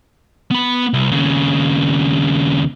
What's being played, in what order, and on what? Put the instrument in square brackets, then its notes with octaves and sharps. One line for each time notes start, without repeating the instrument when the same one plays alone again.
[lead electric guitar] B3 B5
C2
D#2 C#3